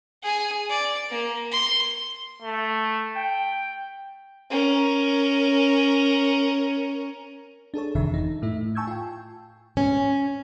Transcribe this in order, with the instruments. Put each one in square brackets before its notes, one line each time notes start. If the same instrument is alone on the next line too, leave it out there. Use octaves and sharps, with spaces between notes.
[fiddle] G#4 G#5
D5
A#3
C6
[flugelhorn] A3
G5
[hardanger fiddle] C#4 A#4
[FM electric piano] D4 G#4 A4 C#5
G1 F2 C3 D#3 E3 E5
D#4
A2 A3 E4
G#5 A5 C#6 E6 G6 G#6
F4 G5
[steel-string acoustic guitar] C#4